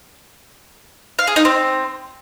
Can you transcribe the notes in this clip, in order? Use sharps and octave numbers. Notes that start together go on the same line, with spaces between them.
F5
G#4
D#4
C4